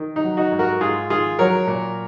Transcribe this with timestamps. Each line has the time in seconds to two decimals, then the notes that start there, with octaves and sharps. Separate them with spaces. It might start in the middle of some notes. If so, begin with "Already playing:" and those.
Already playing: D#3
0.16 D#4
0.23 F#3
0.37 D#4 F#4
0.52 G#2
0.59 F#4 A#4
0.81 G#2 F4 G#4
1.10 D#3 F4 G#4
1.39 F#3 A#4 C#5
1.67 A#2